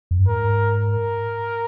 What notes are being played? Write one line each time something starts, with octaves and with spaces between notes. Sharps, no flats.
F2
G2
G#2 A#4
A#4